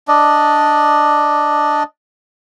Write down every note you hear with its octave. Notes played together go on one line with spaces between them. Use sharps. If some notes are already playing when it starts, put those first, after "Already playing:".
D4 D5 D#5